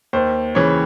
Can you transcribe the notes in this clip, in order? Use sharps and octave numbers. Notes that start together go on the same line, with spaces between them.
D#2 C5
C#3 E3 C#5